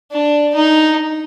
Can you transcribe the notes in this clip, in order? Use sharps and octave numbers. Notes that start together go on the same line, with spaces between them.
D4
D#4